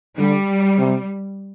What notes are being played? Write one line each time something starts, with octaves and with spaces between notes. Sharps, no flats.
D3 G3
C3